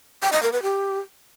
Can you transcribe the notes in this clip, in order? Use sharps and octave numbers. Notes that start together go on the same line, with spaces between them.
G5
D#5
A#4
B4
G4